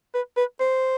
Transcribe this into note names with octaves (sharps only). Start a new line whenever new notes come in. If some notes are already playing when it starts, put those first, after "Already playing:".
B4
B4
C5